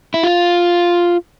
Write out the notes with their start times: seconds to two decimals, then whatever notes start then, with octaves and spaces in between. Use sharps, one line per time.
0.14 E4
0.23 F4